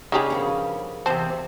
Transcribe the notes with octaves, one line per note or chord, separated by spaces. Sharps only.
C#3 D4 D#4 G4 G#4
F3 A#3 B3
E2 C3 C4 C5 G5 A5